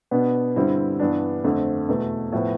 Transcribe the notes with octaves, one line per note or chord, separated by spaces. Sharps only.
B2 B3 D4
G2 D3 G3 C4 E4
G2 E3 B3 D4
F2 D3 A3 C4
E2 B2 A3
A2 F3 B3